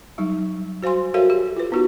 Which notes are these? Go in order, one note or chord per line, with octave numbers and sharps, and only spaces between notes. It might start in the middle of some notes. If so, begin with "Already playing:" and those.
F#3 G3 D#4
F#4 C5 F5 G#5 C6
F#4 A4 A#4 C#5 E5 F5
G4
F4 B4
B3 D#4 F#4 G4